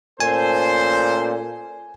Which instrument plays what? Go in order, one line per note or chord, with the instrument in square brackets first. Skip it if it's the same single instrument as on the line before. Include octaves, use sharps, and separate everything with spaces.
[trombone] A#2 [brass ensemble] A3 C#4 A4 [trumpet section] C5 [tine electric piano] G#5